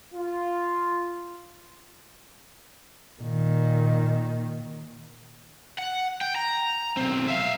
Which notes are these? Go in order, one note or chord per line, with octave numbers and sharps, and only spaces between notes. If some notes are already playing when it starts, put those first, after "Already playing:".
F4
A#2 D#3
F#5
G5
A#5
B1 C4
E5 F5